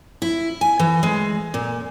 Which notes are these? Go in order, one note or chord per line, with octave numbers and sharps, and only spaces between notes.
E4
G#5
E3
G#3
A#2